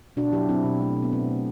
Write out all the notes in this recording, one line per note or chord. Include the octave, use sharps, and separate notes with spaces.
B2 D4 F#4
F#3 E4 G4
F#3 C4 E4
B2
A3
B2
B3
B2 C4
A3